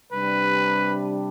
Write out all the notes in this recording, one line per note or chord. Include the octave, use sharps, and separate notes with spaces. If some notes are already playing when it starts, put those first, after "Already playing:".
C3 G3 D4 B4